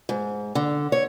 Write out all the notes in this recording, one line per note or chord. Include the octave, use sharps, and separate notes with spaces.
G#2
D3
C#5